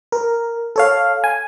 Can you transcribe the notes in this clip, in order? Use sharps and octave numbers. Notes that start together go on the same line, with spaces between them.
A#4
A4 C#5 F5
G#5